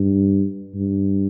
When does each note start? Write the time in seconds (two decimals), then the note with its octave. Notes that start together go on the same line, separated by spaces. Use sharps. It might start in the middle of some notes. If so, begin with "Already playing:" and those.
Already playing: G2
0.75 G2